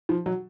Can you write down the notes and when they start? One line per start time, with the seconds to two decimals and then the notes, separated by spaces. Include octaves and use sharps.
0.09 F3
0.26 F#3